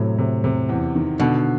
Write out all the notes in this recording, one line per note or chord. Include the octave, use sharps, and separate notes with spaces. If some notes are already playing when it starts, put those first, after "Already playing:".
Already playing: A2 C3 F#3
C3
C3
E2
D#3
B2 D3